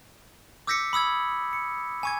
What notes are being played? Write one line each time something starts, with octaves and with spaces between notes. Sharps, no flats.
D6 E6 G6 A#6 B6 C#7
B5 D#6 E6 G#6
C#7
G#5 C#6 G#6